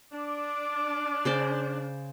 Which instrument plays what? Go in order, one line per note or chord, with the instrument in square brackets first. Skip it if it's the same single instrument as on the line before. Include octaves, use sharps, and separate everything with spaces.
[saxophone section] D4 [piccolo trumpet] D6
[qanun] C#3 C5 D5